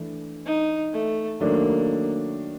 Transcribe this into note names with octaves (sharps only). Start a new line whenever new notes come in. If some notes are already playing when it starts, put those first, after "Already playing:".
Already playing: E3 A3 D4
D#4
A3
D#3 F#3 A3 A#3 D4